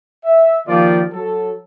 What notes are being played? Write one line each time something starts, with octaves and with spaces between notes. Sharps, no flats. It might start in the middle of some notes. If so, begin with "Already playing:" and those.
E5
D#3 F3 A#3 F4 G4 D5
F#3 A4